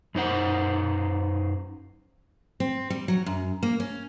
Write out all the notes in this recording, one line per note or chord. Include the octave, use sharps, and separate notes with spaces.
F#2 D#4 C5 F#5
C4
G3
F#3
F#2
A#3
C#4